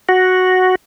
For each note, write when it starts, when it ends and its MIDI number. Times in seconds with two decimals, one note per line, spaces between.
0.09 0.75 66